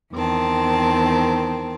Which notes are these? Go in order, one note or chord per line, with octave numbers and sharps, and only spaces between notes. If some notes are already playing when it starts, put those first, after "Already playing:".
E2 D#3 C4 A5